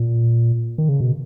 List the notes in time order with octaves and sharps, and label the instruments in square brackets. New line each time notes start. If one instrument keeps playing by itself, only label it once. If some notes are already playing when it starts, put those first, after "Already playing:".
Already playing: [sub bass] A#2
D#3
C#3
B2